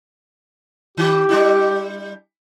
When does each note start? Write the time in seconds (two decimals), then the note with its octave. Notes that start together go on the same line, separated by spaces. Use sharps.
0.97 D#3 G4
1.29 G3 D4 E4